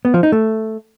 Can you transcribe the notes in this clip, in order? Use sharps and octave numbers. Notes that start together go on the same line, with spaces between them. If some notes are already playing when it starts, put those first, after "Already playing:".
B3
F3
D#4
A3